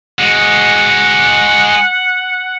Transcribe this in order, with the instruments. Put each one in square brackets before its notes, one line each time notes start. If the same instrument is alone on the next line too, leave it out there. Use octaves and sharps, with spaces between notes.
[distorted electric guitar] G#3 F#4 [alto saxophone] F#5